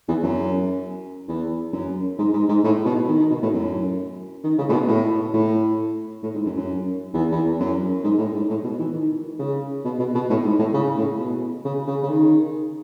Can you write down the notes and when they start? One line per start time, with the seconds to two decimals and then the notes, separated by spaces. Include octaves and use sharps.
0.08 E2
0.23 F#2
1.28 E2
1.73 F#2
2.18 G#2
2.33 G#2
2.48 G#2
2.64 A2
2.86 B2
3.08 D#3
3.19 D#3
3.31 B2
3.43 A2
3.53 F#2
4.44 D#3
4.58 C#3
4.69 A2
4.73 B2
4.88 A2
5.34 A2
6.23 A2
6.34 G#2
6.46 F#2
6.57 F#2
7.14 E2
7.32 E2
7.59 F#2
8.04 G#2
8.19 A2
8.35 G#2
8.50 A2
8.64 B2
8.79 E3
8.94 D#3
9.39 C#3
9.85 B2
9.99 B2
10.14 B2
10.30 A2
10.44 G#2
10.59 A2
10.74 C#3
10.97 A2
11.19 B2
11.65 C#3
11.88 C#3
12.03 C#3
12.09 D#3